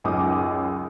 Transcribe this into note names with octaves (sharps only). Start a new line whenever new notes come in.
C#2 F#2 C#4 D#4 D6 D#6